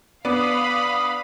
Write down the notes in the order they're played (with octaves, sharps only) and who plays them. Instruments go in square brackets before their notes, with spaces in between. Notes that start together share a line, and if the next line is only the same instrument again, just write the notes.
[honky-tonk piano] B3 D4 D6 [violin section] F5 B5 [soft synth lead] D#6